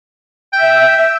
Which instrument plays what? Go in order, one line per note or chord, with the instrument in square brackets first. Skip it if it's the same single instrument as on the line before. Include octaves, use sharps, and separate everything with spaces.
[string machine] E5 [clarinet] G5